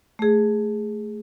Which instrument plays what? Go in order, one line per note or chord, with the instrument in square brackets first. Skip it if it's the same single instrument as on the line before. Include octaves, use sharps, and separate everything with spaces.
[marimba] A3 G#4